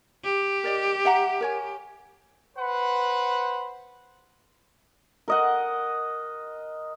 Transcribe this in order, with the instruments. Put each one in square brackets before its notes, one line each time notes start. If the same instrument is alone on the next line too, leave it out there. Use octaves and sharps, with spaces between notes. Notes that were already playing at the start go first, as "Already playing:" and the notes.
[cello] G4
[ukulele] A#4 D5 D#5
E5 F#5 A#5
A#4 C#5 G#5
[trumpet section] B4 C5 F#5
[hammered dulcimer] A#4 D#5 F#5